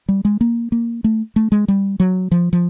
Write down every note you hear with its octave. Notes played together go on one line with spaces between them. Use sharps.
G3
G#3
A#3
A#3
A3
A3
G#3
G3
F#3
F3
F3